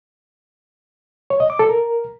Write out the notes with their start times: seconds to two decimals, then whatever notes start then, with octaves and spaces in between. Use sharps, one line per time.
1.30 C#5
1.40 D#5
1.50 D6
1.59 A4
1.69 A#4